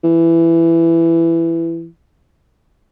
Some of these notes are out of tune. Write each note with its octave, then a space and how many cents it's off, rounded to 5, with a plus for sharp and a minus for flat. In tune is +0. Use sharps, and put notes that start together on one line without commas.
E3 +15